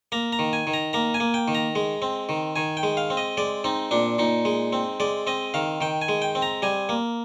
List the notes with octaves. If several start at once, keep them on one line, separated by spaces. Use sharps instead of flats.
A#3 A#5
A#5
D#3
G#5
D#3
A#5
A#3 A#5
G#5
A#3
G5
D#3
A#5
G#3
C4
D#3
D#3 G#5
G5
G#3
F5
C4
D#5
G#3 D5
C4 D#4
A#2 D4
A#2 D#4
G#3
C4
G#3 D5
C4 D#5
D#3 F5
D#3 G5
G#5
G#3
G5
C4
A#5
G3 G#5
A#3